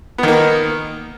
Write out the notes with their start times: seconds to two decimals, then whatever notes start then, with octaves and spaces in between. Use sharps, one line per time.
0.18 B3
0.23 D#3
0.28 A#3